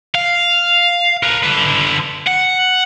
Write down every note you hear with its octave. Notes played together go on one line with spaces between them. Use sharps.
F5
A#4 B4
D3 B4
F#5